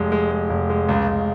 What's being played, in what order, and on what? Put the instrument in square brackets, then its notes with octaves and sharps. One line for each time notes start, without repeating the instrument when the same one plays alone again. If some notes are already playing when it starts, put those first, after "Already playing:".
Already playing: [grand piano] F1 G#3
G#3
G#3
F1
G#3
C#2
C#2